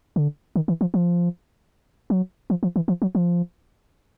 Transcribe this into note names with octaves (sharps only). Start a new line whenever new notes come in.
D3
D#3
E3
F3
F3
F#3
F3
F3
E3
F3
F#3
F3